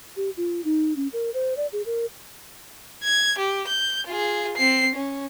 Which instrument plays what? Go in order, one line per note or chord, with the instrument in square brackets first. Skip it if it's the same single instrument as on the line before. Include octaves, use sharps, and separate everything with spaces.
[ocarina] G4
F4
D#4
C#4
A#4
C5
D5
G#4
A#4
[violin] G#6
G4
G6
F4 G#4
C4 C7
C#4